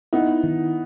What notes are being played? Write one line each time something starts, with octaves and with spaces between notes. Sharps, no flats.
B3 D#4 E4
D#3